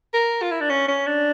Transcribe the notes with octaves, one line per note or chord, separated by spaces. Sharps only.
A#4
F4
E4
D4
C#4
C#4
D4